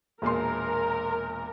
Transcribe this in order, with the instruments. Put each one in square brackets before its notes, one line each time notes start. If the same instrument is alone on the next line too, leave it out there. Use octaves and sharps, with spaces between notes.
[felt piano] E1 A#2 C6 [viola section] A#4